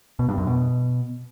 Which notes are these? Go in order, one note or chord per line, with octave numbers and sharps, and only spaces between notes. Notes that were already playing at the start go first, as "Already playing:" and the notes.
B2
G2
F#2
B2